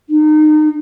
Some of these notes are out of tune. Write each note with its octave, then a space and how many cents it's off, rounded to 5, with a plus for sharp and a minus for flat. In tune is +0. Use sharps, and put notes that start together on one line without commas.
D#4 -30